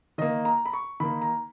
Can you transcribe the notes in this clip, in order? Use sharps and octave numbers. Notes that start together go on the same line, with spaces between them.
D#3 A#3 D#5
A#5
B5
C#6
D#3 A#3 B5
A#5